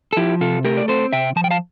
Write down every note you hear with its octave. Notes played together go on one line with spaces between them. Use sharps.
A4
F3 E4 G4
C3 F4 A4
A3 G4 A#4
D5
C4 A4 C5
C3 E5 G5
F3 A5
G5
F5 A5